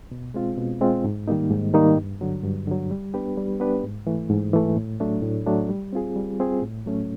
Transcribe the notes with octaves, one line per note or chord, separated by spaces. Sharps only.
B2
G#3 C4 F4
B2
G#3 C4 F4
G#2
D#3 G3 A#3 D#4
G#2
D#3 G3 A#3 D#4
G2
D3 F#3
G2
D3 F#3
G3
B3 D4 G4 B4
G3
B3 D4 G4 B4
G#2
E3 A3
G#2
E3 A3
A2
F#3 A3 D4
A2
F#3 A3 D4
G3
C4 F4 G#4
G3
C4 F4 G#4
A2
F#3 A3 C#4